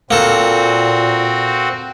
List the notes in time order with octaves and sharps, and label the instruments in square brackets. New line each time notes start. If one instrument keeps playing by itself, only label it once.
[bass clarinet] A#2 [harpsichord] A#3 A4 [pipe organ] C4 F#4